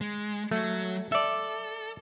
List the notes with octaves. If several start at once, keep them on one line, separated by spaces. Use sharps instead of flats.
G#3
F#3 A3
A4 D5 E5